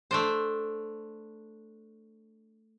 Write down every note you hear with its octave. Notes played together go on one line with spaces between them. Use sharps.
A3 D4 C5